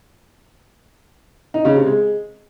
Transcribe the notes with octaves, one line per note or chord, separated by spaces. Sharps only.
D#4
C#3
C3
G#3